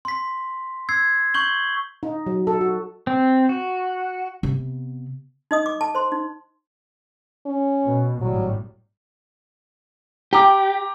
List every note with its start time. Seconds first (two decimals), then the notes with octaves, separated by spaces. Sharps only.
0.05 C6 B6
0.89 E6 G#6 C7
1.34 C#6 G6 F#7 G7
2.03 D#4
2.26 F#3
2.47 A4
2.61 F#4
3.07 C4
3.49 F#4
4.43 C3 B3
5.51 D#4 D#5 D#6
5.66 D6
5.81 A5
5.95 C5 C6
6.12 D#4
7.46 C#4
7.87 B2
8.21 G#1 A2 F#3 G3
10.33 G4 G5 A#5 D6